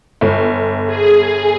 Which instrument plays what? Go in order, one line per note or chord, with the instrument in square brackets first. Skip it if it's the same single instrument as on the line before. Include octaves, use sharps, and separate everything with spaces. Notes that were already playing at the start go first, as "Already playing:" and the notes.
[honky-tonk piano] G1
[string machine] G#4